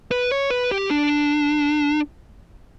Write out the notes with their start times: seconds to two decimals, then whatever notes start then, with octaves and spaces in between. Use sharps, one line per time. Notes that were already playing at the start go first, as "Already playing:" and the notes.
0.11 B4
0.32 C#5
0.50 B4
0.71 G4
0.91 D4